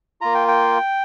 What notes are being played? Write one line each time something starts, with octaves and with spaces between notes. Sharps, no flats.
A#3 F4 A#5
G5
G5